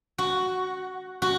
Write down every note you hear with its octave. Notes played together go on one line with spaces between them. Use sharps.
F#4
F#4